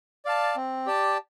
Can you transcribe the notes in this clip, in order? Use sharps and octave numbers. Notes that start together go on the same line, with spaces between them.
D5 F5 A5
C4
G4 D5 A5